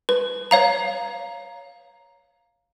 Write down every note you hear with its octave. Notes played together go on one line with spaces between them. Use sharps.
B4
C#5 F5 A#5